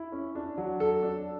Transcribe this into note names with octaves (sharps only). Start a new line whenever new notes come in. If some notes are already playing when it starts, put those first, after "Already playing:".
Already playing: E4
C#4
D4
F#3
A4
D4